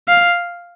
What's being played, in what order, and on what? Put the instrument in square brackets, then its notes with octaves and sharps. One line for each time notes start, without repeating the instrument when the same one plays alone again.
[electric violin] F5